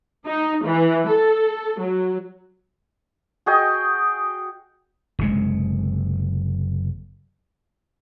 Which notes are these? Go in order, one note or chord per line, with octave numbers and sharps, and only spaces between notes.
D#4
E3
A4
F#3
F#4 G#4 D#5 G5
F#1 C3 G#3